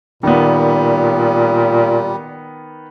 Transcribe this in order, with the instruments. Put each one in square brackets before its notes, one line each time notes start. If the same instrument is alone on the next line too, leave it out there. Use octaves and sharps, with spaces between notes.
[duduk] A#2 [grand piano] D#3 B3 [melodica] G3